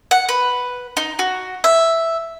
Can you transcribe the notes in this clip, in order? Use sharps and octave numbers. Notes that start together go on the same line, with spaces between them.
F#5
B4
D#4
F#4
E5